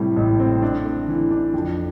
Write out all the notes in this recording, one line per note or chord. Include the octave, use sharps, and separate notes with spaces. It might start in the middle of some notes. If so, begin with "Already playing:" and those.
Already playing: A2 C3 G3
A1
C4
D4
A3
E3
D4
F2